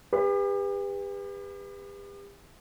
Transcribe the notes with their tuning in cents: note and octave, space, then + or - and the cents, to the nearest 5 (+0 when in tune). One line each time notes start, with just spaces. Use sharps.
G4 +40 B4 +0